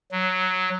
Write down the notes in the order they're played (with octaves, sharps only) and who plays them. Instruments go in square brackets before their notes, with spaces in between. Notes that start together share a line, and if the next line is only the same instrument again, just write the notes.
[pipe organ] F#3